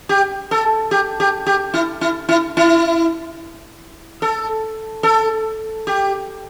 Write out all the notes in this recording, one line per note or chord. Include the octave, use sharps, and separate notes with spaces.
G4
A4
G4
G4
G4
E4
E4
E4
E4
A4
A4
G4